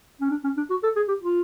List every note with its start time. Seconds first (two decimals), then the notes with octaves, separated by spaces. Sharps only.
0.21 C#4
0.31 D4
0.44 C#4
0.57 D4
0.70 F#4
0.83 A4
0.96 G#4
1.08 G4
1.22 F4